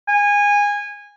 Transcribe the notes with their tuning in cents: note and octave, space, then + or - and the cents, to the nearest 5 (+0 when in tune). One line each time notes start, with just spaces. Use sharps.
G#5 -20